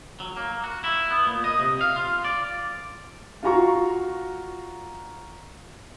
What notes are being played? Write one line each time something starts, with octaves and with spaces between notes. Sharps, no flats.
F#3
A#3
F#4
E4
B3
A#2
D#5
C3
F5
F4
D5
F4 F#4 A#5 C#6